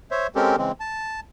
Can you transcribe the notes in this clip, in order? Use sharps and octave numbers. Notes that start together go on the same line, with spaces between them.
C5 C#5 E5
G#3 C4 C#4 G4 A4 A#4
C#3 E3 G#3 C4
A5